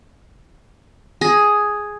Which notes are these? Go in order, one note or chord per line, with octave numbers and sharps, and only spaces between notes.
G#4